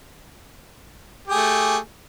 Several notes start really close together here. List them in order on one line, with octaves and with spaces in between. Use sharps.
G4 G#4 A3